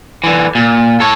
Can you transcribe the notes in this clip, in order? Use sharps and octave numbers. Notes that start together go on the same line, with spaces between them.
D3 E3
A#2
A4 C#5